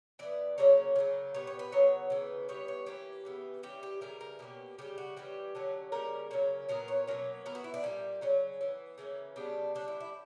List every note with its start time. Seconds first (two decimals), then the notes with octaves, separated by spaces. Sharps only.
0.19 E3 B3 D5
0.58 C#3 F#3 A#3 C#4 C#5
0.96 C#3 F#3 A#3
1.34 A#2 G3 B3 C#5
1.47 C#5
1.59 B4
1.72 C#3 F#3 B3 C#5
2.10 C#3 E3 B3
2.48 E3 G3 B3 C#5
2.68 C#5
2.86 E3 A#3 C#4 G4
3.25 C#3 E3 B3
3.63 E3 G3 C#4 G4
3.83 G4
4.01 C#3 E3 G3 A#4
4.21 A#4
4.39 B2 A#3 C#4 G4
4.79 C#3 E3 G3 G4
4.98 F#4
5.17 E3 G3 C#4 G4
5.55 D3 F#3 C#4
5.92 C#3 G3 A#3 C#4 A#4
6.31 C#3 F#3 A#3 C#4
6.69 A#2 F#3 B3 A#4
6.88 C#5
7.07 B2 F#3 A#3 C#4
7.46 E3 B3 A#4
7.55 F#4
7.64 E4
7.74 D4
7.83 A#2 G3 A#3 C#4
8.21 C#3 F#3 C#4
8.61 E3 B3
8.98 C#3 E3 A#3 C#4
9.36 C#3 G3 B3 D4
9.75 D3 G3 C#4 D4
9.88 E4
10.01 E4